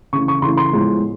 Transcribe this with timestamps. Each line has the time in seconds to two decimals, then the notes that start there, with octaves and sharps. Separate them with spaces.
0.13 C#3 E3 A3 C#6
0.28 C#6
0.42 C#3 E3 A3 C6
0.57 C6
0.72 A2 F3 G#3 B3